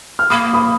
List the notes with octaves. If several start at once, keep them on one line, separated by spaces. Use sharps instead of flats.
F6
A#3 B5 D#6
B5 D#6